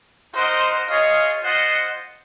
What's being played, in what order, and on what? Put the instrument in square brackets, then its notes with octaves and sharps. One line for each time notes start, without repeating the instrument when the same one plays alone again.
[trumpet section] D#4 A#4 D#5 F#5 [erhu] C5
[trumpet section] F4 G#4 C#5 F5 [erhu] D#5
[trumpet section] F4 C5 D#5 F#5